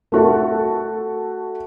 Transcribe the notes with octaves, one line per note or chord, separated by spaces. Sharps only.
A3 F#4 A4